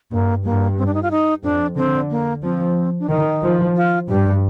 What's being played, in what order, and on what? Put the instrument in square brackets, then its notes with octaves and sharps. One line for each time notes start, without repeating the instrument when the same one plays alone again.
[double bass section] G2 [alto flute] A#3
[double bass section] G2 [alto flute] A#3
[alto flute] C4
D4
D#4
F4
D#4
[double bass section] F2 [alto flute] D4
[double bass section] D3 [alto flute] C4
[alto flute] A#3
[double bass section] F3 [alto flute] C4
[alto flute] D4
[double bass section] D#3 [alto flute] D#4
[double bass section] F3
[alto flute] F4
[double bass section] G2 [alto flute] G4